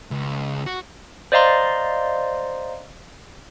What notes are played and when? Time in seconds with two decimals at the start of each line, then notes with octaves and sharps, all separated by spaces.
0.11 C#2
0.66 F#4
1.32 C5 D5 D#5 F5 A#5 C6